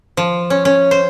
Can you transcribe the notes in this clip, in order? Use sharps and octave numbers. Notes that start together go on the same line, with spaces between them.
F3
C#4
C#4
C5